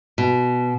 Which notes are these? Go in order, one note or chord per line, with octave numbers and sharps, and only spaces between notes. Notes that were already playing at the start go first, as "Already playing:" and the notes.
B2